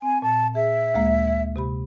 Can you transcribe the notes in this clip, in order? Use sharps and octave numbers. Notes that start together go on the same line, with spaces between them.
C4 G#5
A#2 A5
G#4 E5
D2 G#3 A#3
C3 G4 B5